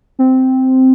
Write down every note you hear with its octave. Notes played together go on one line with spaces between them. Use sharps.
C4